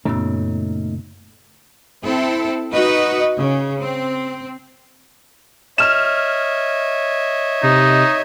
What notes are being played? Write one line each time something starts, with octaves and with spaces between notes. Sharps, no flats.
F#2 A#2 C#3 A3 B3 C#4 D#4 E6
C4 E4 A4
D#4 F#4 B4 D#5
C#3
C4
C#5 D#5 E5 F6 E7
C3 D#4